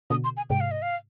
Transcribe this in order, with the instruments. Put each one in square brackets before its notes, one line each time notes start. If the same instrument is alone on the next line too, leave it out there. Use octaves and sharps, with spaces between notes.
[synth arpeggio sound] B2 D3 [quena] D#6
[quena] C6
G#5
[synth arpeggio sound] G#2 C3 [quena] G5
[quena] F5
D#5
F5